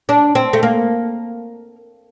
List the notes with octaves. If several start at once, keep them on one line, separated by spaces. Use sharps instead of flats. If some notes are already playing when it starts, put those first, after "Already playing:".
D4
C4
A3
A#3